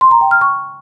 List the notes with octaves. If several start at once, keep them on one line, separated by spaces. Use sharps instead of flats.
C6
A#5
G5
F6
C#6